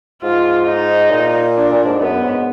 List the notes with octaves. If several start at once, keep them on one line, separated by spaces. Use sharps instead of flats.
G#2 F4
D#4
A#2
D4
A#2
G#2
F#2 B3
G#2